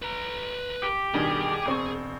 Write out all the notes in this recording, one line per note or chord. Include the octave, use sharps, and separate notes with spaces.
B4 A#5
G4
G2 B2 D#3 G#4
E1 C4 C#6